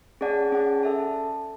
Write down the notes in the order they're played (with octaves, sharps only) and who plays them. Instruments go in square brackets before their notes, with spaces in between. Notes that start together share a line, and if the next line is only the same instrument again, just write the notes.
[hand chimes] C#4 G#4 D5 F#5 A5
C#4 G#4 D5 F#5 A5
A4 E5 A5